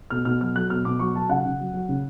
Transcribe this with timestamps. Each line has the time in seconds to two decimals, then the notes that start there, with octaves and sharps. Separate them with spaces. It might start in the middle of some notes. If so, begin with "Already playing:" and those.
0.10 B2 F6
0.25 B2 F6
0.41 F#3 F6
0.55 F#3 F#6
0.70 B2 F6
0.85 B2 D6
0.99 F#3 C#6
1.15 F#3 A5
1.29 C#3 F#5
1.45 C#3
1.60 F#3
1.74 F#3
1.89 C#3